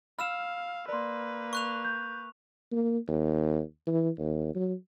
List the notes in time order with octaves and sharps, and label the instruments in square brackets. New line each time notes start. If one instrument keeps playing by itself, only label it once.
[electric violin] F5 [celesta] B5 E7 [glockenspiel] E6 F6
[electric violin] A#3 B4 [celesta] D5 C6
[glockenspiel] C#6 F#6 F7
[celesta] G6
[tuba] A#3
D#2
E3
D#2
F#3